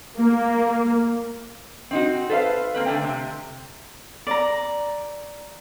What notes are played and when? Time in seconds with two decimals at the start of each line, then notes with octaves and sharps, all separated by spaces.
0.17 A#3
1.91 C4 D#4 F#4
2.29 A4 B4 C5 D5 F5
2.74 A#3 C4 B4
2.86 D3 A3 G5
3.04 C3
4.27 D5 A#5